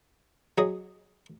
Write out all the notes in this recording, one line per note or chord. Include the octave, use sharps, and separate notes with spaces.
F#3 G#4 D#5